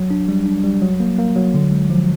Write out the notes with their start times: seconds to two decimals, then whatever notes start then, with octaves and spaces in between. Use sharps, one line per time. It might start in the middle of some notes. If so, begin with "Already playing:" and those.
Already playing: F#3
0.11 D4
0.28 G3
0.46 D4
0.64 G3
0.82 F#3
1.00 A#3
1.18 A#3
1.36 F#3
1.54 D3
1.72 G#3
1.90 F3